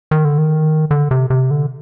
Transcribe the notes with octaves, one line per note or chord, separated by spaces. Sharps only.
D#3
D3
D#3
D3
C3
C3
D3